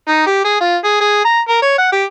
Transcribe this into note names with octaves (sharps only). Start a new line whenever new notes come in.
D#4
G4
G#4
F4
G#4
G#4
A#5
A#4
C#5
F#5
G4